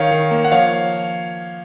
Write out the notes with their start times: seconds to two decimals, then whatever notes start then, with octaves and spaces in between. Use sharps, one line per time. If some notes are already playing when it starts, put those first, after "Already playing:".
Already playing: D#3 C#5 F5
0.11 D#3
0.31 A#3
0.45 F#5
0.52 F3 C#5 F5